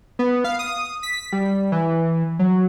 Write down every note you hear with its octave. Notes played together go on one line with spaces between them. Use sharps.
B3
F5
D#6
B6
G3
E3
F#3